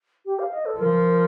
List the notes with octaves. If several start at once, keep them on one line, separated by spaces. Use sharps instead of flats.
G4
F5
D#5
A4
F3 A#4